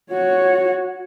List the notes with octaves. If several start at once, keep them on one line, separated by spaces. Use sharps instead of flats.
F#4 C#5